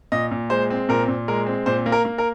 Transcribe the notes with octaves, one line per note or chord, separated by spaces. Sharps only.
A#2 D#5
A#2
G#3 C5
C4
A#2 A#4
A#2
G#3 A#4
C4
A#2 C5
A#3
A#4
A#3
A#4